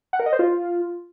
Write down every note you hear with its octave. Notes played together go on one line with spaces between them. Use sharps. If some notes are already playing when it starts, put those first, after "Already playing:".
F#5
A#4
D#5
C5
F4